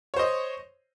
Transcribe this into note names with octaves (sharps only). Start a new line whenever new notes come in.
C5 C#5 D#5